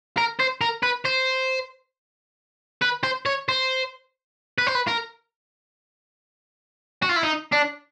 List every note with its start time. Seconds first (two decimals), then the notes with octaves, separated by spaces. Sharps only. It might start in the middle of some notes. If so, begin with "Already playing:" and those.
0.17 A#4
0.39 C5
0.61 A#4
0.83 B4
1.05 C5
2.82 B4
3.04 C5
3.26 C#5
3.49 C5
4.58 B4
4.67 C5
4.75 B4
4.88 A#4
7.02 F#4
7.09 F4
7.16 E4
7.23 D#4
7.53 D4